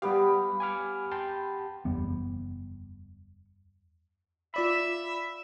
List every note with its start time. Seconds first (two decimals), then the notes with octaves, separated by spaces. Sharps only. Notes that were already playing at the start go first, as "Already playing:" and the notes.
0.02 G3 B3 G4 F5
0.60 G#5 D6 F6
1.11 G5 A5 C6
1.85 F#1 E2 G3 B3
4.54 F4 D5 E5 B5